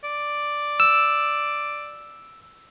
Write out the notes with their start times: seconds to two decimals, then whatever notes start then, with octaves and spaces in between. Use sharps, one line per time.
0.04 D5
0.80 E6